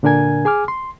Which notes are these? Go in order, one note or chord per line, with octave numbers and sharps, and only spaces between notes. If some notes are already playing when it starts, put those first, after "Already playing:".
A#2 D3 D4 A#4 G#5 G#6
G#4 G#5 D6 F6
C6